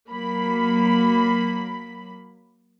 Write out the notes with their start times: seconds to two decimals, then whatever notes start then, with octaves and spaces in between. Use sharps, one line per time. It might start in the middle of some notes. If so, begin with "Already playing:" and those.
0.10 F#3 A#3 B5